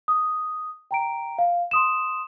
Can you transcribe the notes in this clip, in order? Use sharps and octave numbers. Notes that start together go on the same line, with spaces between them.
D#6
G5 A#5 D7
F5
C6 D#6 E7